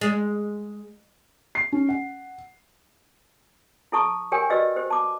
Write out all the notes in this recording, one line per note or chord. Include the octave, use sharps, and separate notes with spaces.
G#3
C7
C#4
F#5
E4 A4 A5 C#6
G4 A#4 C#5 G5 G#5
F#4 G4 B4 D5 D#5 E6
G4 C5
A5 D6